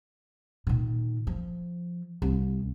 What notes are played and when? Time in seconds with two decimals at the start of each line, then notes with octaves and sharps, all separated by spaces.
0.67 A#2 D#3
1.27 F3
2.22 C2